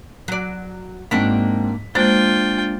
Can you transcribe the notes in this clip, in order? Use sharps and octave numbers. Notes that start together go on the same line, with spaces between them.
F#3 D5
G#2 A#3 C4 D4 F#4 B6
G#3 A#3 D4 F4 C5 G5 A6